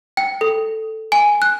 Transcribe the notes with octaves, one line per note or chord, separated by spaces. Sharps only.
G5
A4
G#5
F#6